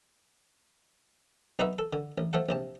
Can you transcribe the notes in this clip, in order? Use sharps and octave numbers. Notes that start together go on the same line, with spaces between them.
B1 D#4 F#4 B4 D#5 E5
A4
D3
A1
F3 A3 A4 F#5
A#1 C3 A5